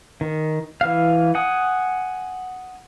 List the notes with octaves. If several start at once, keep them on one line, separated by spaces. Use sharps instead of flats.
D#3
E3 F5
F#5 G#5 D#6